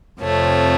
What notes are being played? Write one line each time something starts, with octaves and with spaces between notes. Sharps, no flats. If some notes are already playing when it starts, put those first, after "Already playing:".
F2 C3 F3 A3 C#5